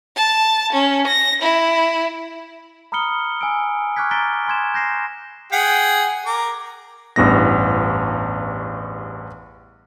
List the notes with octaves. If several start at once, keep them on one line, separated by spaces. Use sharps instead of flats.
A5
C#4
A#6
E4
A#5 B5 D#6 F6 C#7 G7
G#5 E6 D7
C#6 D6 F6 F#6 G#6 B6
A#5 A6 B6 D7 G7
G#5 C6 G#6 E7
G6 A#6 C7 E7
G#4 F#5 G5
A#4 D6
A1 E2 G2 B3 E4 A#6